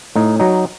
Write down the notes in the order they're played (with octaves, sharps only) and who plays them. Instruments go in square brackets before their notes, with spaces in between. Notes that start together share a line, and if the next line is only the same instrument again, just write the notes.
[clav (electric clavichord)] A2 D#4
F#3 D#4